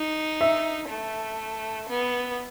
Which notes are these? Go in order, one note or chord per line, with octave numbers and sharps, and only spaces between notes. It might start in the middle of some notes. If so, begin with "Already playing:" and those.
Already playing: D#4
E5
A3
B3